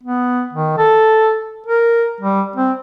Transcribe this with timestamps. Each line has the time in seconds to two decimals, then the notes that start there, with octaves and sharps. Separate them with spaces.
0.03 B3
0.53 D#3
0.78 A4
1.66 A#4
2.21 G3
2.56 C4